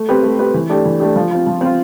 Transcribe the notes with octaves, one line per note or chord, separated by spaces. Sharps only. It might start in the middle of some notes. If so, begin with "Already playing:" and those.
Already playing: A3
C4 G4 B4
A3
C4 G4 B4
E3
A3 D4 G4
E3
A3 D4 G4
F3
C4 F4
F3
C4 F4